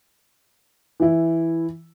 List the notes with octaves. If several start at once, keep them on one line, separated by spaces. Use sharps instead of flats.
E3 E4